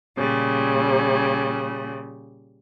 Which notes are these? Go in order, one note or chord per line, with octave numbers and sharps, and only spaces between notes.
A#2 C#3 G3